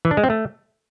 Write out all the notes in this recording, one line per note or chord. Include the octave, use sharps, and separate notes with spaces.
E3
D4
G#3
C4
A3